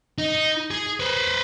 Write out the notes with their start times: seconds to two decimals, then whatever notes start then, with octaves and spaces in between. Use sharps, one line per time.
0.18 D#4
0.71 G#4
1.00 B4 C5